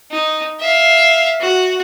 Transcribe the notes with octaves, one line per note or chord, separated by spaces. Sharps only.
D#4
E5 F5
F#4